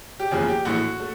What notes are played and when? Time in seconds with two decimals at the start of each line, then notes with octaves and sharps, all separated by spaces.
0.20 G4
0.31 F#1 E2 C#3 F3 G#4
0.48 G4
0.65 A#1 A2 E3 A3 F#4
1.00 A3